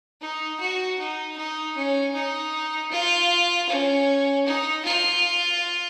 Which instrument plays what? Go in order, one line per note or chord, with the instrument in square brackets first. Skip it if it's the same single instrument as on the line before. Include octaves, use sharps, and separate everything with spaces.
[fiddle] D#4
F#4
D#4
D#4
C#4
D#4
F4
C#4
D#4
F4